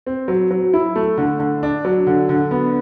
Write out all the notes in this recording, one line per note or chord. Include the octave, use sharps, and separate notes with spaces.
C4
F#3
F#3
E4
A3
D3
D3
D4
F#3
D3
D3
B3